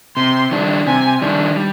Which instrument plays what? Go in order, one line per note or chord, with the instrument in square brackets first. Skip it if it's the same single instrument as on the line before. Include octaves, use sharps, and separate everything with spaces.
[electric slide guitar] C3 [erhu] C6
[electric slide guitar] D#3 G3 D4
[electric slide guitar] C3 [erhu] G#5
[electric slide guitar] D#3 G3 D4
G3